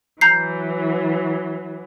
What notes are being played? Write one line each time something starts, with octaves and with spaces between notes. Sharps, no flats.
E3 F#3 A#5 G6 C7